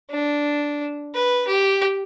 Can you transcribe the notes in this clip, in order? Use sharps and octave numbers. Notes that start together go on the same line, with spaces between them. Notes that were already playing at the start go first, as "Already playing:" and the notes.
D4
B4
G4